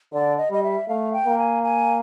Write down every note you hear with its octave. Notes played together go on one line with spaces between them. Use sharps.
D3 D5
D#5
G3 D#5
E5
A3 F5
G5
A#3
G#5
G#5